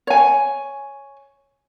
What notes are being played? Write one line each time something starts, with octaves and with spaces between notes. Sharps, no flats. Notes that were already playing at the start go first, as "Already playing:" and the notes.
C#5 G#5